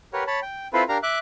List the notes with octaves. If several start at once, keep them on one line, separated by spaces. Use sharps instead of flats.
G4 A#4 B4 C#5 F#5
C#5 A5 B5
G5
C4 E4 F4 A4 B4 C5
D4 G4 A#4 F5 A#5
E5 D6 F#6